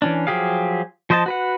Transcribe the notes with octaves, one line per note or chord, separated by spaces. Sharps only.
E3 C#4 D4
F3 F#3 G4 G#4 F5
F3 C5 D#5 E5 A5
F#4 B4 F#5